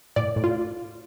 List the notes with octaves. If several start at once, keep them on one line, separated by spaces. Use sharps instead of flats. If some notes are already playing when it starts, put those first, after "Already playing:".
A2 D5
A2
F4